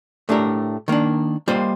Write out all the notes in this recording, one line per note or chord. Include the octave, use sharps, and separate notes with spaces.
A2 A3 D4 G4 A#4
D#3 A#3 D4
G3 A#3 F4 C5 D#5